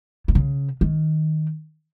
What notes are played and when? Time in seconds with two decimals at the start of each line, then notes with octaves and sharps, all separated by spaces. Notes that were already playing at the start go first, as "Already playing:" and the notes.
0.28 D#3
0.35 C#3
0.81 D#3